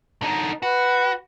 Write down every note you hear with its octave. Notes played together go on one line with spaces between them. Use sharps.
D3 D#4
F#4 B4